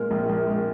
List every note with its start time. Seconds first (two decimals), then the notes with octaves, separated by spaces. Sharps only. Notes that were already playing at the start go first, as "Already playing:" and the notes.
Already playing: A#2 G#3 A#4
0.11 A#1
0.29 A#1
0.47 G#3